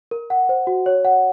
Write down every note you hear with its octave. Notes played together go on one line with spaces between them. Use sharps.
A#4
F#5
C5
F#4
C#5
F#5